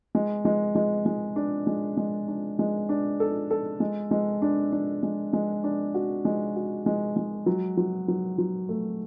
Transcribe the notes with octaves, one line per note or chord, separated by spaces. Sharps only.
G#3
G#3
G#3
G#3
D4
G#3
G#3
D4
G#3
D4
A4
A4
G#3
G#3
D4
D4
G#3
G#3
D4
F#4
G#3
F#4
G#3
G#3
F#3
F#3
F#3
F#3
A3